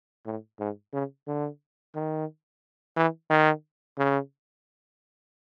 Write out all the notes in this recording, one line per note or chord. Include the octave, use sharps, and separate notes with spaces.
A2
G#2
C#3
D3
D#3
E3
D#3
C#3